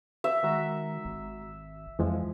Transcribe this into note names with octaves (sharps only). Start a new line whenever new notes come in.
E5
D#3 G#3 F#4 A#5
G#1
F2 E3 F3 G#3